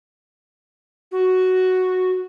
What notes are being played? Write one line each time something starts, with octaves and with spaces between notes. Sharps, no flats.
F#4